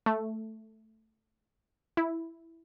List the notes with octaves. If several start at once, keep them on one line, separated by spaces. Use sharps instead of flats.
A3
E4